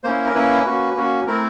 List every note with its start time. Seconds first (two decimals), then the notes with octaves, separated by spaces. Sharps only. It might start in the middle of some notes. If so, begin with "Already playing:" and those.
0.04 A#3 C#4 E4 C5
0.25 A#4
0.34 A#3 C#4 E4 B4
0.65 A#3 C#4 F#4
0.96 A#3 C#4 F#4
1.27 A3 C4 E4 A#4